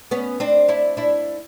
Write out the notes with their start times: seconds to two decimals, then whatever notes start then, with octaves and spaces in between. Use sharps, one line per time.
0.11 B3 C#4
0.40 C4 D4
0.68 D4 E4
0.97 D4 E4